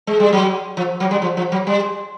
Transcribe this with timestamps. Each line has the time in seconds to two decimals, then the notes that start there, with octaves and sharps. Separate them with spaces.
0.07 G#3
0.20 G3
0.33 F#3
0.77 F3
1.00 F#3
1.11 G3
1.22 F3
1.37 F3
1.52 F#3
1.67 G3